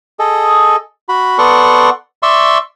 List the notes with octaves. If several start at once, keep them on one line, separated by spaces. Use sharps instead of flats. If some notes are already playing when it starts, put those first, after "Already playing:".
G#4 A4 D#5
F#4 B5
B3 A4 D5 F#5 C6 C#6
D5 E5 C6 C#6 E6